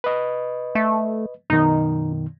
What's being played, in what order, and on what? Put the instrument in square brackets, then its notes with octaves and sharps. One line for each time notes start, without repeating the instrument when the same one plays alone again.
[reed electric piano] B4 D#5
[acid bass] A3
[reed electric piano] F#2 B2 D#3 [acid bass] D#4